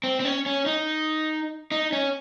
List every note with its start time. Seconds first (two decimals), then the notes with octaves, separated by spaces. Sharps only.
0.04 C4
0.20 C4
0.25 C#4
0.46 C#4
0.66 D#4
1.71 D#4
1.92 C#4